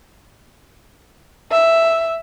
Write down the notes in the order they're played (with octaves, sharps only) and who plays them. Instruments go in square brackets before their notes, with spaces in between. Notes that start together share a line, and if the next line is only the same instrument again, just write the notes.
[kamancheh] E5